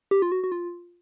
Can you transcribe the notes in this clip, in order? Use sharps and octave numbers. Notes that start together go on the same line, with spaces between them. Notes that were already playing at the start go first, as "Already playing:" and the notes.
G4
F4
F#4
F#4
F4